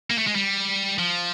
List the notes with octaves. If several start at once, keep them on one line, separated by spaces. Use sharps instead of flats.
A#3
A3
G#3
G3
F3